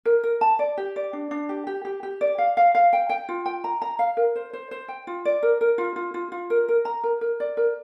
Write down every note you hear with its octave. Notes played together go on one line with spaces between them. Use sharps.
A#4
A#4
A5
D5
G4
D5
D4
D4
G4
G4
G4
G4
D5
F5
F5
F5
G5
G5
F4
G5
A#5
A#5
F5
A#4
C5
C5
C5
G5
F4
D5
A#4
A#4
F4
F4
F4
F4
A#4
A#4
A#5
A#4
A#4
D5
A#4